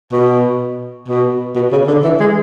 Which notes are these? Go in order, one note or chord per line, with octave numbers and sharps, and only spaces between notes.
B2
B2
B2
C#3
D3
E3
G#3